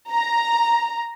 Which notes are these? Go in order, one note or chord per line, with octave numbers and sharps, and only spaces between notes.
A#5